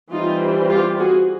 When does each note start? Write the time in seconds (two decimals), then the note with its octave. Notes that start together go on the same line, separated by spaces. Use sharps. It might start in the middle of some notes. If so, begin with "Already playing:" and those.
0.12 E3 G3 C4 D#4 F4
0.70 F4 G4
0.99 F#4 G#4